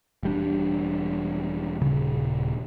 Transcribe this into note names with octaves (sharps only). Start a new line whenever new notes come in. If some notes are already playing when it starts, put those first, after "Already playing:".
E1 G3 D4
D#1 C#3